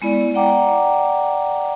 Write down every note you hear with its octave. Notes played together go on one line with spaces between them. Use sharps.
G#3 B3 E4 D5
D5 F#5 G5 A#5 D6